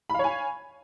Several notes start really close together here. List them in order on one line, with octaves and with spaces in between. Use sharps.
B5 F5 C#5 G#5